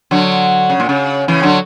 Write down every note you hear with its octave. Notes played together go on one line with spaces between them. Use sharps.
D3 F#3
C#3
A#2
C#3
C#3 E3
D3 F#3